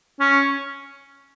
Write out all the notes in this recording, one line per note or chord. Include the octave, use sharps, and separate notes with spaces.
C#4